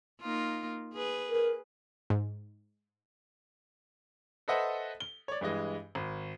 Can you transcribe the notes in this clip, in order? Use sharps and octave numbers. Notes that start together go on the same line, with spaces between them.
A#3 D#4 F4
G#4 B4
A#4
G#2
A4 B4 C5 D#5 E5 F#5
G7
C#5 D5
G2 E3 G#3 D#5
G#1